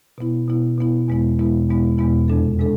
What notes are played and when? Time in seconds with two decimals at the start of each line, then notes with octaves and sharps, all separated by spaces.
0.18 B2 B3 E4
0.48 B2 B3 E4
0.78 B2 B3 E4
1.08 E2 B2 G#3 B3 E4
1.39 E2 B2 G#3 B3 E4
1.68 E2 B2 G#3 B3 E4
1.98 E2 B2 G#3 B3 E4
2.28 F2 C3 G#3 D4 A4
2.59 C3 G#3 D4 A4